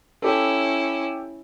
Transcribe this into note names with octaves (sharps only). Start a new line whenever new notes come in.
C#4 E4 G4 A4